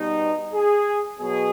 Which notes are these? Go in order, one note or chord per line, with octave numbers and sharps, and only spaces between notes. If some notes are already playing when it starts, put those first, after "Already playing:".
Already playing: B2 G3 D#4
G#4
B2 F#3 G#4